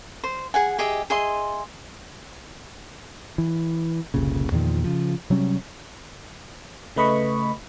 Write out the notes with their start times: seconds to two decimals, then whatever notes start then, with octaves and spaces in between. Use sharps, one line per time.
0.24 C5
0.54 G#4 F#5 G#5
0.78 G4 G#4 D#5 E5
1.10 G#4 D#5 E5 C6
3.38 E3
4.14 F1 C2 A#2 C#3
4.52 E2 A#2 D#3 F3
4.84 C#3 F3
5.30 C3 F#3 G3 C#4
6.96 C#3 A3 B4 D#5 B5 C#6